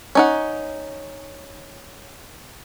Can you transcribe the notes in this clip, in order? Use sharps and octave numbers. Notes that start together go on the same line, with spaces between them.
C#4 D#4 F#5